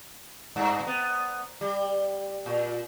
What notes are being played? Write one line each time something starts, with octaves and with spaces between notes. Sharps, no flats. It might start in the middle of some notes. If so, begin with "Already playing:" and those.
G2
B3
G3
A#2